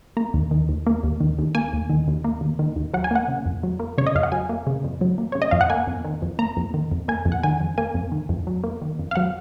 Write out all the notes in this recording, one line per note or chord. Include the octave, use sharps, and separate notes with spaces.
A#3 A#5
D#2
D#3
D#2
A#3
D#2
D#3
D#2
A#3 G#5
D#2
D#3
D#2
A#3
D#2
D#3
D#2
F#3 F#5
G#5
A#3 F#5
C#3
F2
F#3
A#3
C#3 C#5
D#5
F2 F5
F#5
F#3 G#5
A#3
C#3
F2
F#3
A#3
C#3 C#5
D#5
F2 F5
F#5
A#3 G#5
F2
D#3
F2
A#3 A#5
F2
D#3
F2
A#3 G#5
F2
F#5
D#3 G#5
F2
A#3 G#5
F2
D#3
F2
F#3
A#3
D#3
F2
F5
F#3 F#5